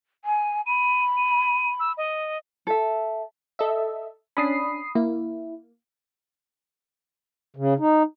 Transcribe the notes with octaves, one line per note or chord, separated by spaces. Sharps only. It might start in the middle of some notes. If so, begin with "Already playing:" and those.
G#5
B5 D#7
D#7
E6
D#5
A4 E5
A4 D#5 E5
C#4 D4 B5 D#6 C7
A#3 E4
C#3
D#4